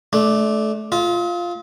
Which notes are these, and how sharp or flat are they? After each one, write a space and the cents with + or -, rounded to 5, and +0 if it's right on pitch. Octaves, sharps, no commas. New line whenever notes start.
A3 -25 D4 +0
F4 +0 D#5 +45